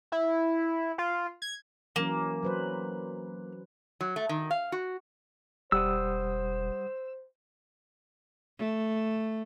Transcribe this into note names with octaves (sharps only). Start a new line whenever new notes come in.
E4
F4
G#6
E3 F#3 A#3 C#4
F#3 B4 C5
F#3
A3
D#3
F5
F#4
E1 G3 C5 F#5 D#6 E6
A3